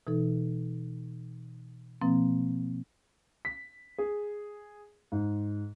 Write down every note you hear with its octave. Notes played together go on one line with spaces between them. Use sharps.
B2 E3 D#4 A4
B2 F3 A#3 C4
B6
G#4
G#2